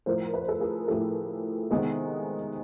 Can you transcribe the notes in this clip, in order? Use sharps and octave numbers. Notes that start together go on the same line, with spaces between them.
A2 F3 A3 A#4 C5
B4
C5
A4 B4
G#4 A#4
A2 F3 A3 G4 A4
C3 D#3 G#3 B3